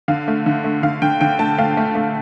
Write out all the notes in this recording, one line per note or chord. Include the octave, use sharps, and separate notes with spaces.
D3 F5
A3
D3
A3
D3 F5
D3 G5
D3 G5
A3 A5
A3 F5
A3
A3